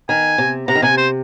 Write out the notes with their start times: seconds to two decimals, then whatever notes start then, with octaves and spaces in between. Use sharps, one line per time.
0.09 D#3 G#5
0.38 C3
0.68 C3 A#5
0.75 D#3
0.82 C3 G#5
0.98 C5